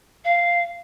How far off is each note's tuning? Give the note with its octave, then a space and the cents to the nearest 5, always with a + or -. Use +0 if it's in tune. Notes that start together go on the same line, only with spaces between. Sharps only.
F5 -5